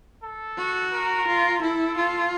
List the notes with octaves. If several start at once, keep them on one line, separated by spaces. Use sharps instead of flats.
A4
F#4
A#4
F4
E4 A4
F4